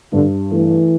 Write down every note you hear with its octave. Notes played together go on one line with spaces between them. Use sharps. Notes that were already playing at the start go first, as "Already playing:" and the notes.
G2 D3
E3 A3